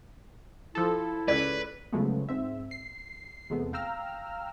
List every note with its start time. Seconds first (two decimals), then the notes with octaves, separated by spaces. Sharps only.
0.75 F3 E4 A4
1.28 C#2 A4 B4 C#5 D5
1.93 C#3 F3 F#3 G#3 A3 B3
2.29 G#2 C4 E5
2.71 C7
3.50 E2 C3 G#3 A3 B3
3.73 F5 G5 A#5 E6 F6